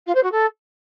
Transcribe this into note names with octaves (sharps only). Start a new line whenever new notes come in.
F4
C5
F#4
A4